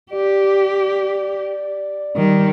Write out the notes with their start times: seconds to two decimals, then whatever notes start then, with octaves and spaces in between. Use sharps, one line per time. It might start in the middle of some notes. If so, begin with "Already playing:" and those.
0.12 G4 D5
2.16 D#3 G3